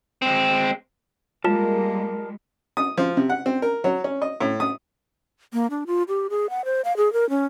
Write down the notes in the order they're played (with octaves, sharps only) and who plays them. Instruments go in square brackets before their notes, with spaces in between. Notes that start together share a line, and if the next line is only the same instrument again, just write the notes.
[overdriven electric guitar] G#3 C4
[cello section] G3 G#3 [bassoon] A#3 [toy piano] F4 [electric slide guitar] A#4 A5
[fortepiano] D#6
F3
C3
F#5
C4
A#4
F#3
C#4
D#5
A2
D#6
[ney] A#3
D4
F4
G4
G#4
F#5
C5
F5
G#4
A#4
C#4